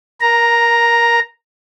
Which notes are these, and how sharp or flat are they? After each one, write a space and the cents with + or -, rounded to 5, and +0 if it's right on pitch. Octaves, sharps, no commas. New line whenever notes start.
A#4 +20 A#5 +0